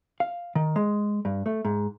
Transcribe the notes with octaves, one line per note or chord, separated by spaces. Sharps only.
F5
D#3
G#3
G2
A3
G#2